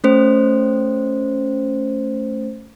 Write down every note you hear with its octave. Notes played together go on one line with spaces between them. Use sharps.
A3 C#4 C5